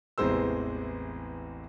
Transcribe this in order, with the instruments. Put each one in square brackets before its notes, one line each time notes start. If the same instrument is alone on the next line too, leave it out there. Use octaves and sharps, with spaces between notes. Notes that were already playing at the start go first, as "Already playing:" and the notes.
[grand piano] A1 E2 C3 G#3 C5 E6